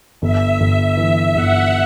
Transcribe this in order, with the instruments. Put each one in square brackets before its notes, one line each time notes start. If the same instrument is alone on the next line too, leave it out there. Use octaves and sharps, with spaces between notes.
[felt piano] G1 [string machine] E5
[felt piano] G1
[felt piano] E3 [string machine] E5
[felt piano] G1 [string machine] F#5